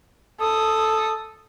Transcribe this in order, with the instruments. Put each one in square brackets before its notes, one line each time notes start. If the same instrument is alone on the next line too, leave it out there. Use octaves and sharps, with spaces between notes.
[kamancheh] A4 D#6